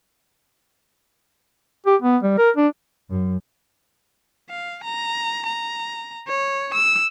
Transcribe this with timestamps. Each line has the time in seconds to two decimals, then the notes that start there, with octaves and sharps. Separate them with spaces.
1.86 G4
2.02 B3
2.23 G3
2.38 A#4
2.57 D4
3.10 F#2
4.50 F5
4.83 A#5
5.46 A#5
6.27 C#5
6.74 E6